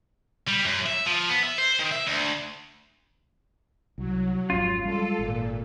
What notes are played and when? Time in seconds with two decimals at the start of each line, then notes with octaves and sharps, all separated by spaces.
0.48 G3
0.65 F#2
0.86 E5
1.06 F3
1.29 B3
1.43 E5
1.58 C5
1.79 D#3
1.91 E5
2.07 D2
3.98 C2 F#3
4.50 G#1 F2 C#4 F4
4.85 G3 G#3 A4
5.19 G#1 A#2